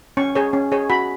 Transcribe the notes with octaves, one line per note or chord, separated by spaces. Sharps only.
C#4 C#6
G#4 C#5
C#4
G#4 C#5
F#4 B5